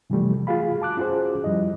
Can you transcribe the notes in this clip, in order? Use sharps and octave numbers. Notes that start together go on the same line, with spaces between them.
C3 E3 F3 G3 A3
F4 F#4 G#4 F5 B5
A5 D6 F#6
C#4 F4 F#4 G#4 C5
F#2 F3 G3 E4 D#5